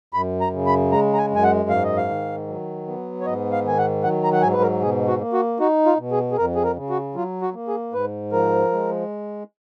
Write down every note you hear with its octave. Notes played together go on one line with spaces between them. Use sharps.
F#2 B5
A#5
C#3
B5
G#3 A#5
A#5
G#5
F#2 G#5
F#5
G#2 F5
D#5
F5
D#3
F#3
B3
C#5
G#2 D#5
F5
D#3 G#5
F#5
F#3 F#5
A#5
F#5
G#2 G#5
B4
A#4
B2 G#4
F#4
A#3
F#4
D#4 F#4
F4
B2
G#4
G#4
F2 A#4
G#4
A#4
C#3
F#4
F#3 F4
F#4
A#3
G#4
G#2 B4
F3 A#4
G#3